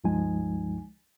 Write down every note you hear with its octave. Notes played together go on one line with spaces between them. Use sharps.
C#2 G2 F3 G#3 D#4 G#5